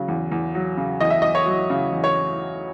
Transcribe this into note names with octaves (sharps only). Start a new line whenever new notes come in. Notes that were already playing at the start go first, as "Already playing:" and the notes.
Already playing: C#3 F#3
E2
E2
F#3
C#3
E2 D#5
E5
E2 D#5
C#5
F#3
C#3
E2
C#5